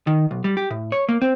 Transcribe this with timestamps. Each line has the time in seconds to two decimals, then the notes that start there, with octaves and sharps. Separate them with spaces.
0.07 D#3
0.31 B1
0.44 G3
0.57 G4
0.71 A2
0.92 C#5
1.09 A#3
1.22 C4